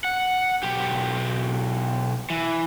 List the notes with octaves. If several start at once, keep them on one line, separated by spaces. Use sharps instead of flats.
F#5
B1 G4
E3